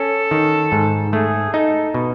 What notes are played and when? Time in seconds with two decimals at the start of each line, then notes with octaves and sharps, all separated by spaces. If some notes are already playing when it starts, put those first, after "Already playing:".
Already playing: C#4 A4
0.31 D#3
0.72 G#2
1.13 A3 G#4
1.54 D#4 A4
1.94 B2